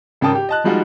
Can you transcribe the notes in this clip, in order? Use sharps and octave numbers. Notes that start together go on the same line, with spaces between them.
G#1 C#3 A#4 G5 A5 D#6
G4
D#5 A5 F#6
F3 G3 G#3 D#4 F4 F#4